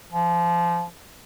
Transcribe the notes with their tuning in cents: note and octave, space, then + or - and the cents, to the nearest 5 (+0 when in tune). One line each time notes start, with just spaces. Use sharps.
F3 -20